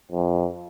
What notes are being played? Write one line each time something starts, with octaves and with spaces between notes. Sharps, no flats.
F2